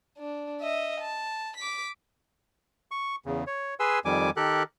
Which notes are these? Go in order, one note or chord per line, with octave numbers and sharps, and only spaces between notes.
D4
D#5 E5
A5
D6 B6
C#6
E2 C#3
C#5
G#4 B4 G#5 C6 E6
F2 D#3 G3 G#5 D6
D#3 G4 A4 A#4 F#6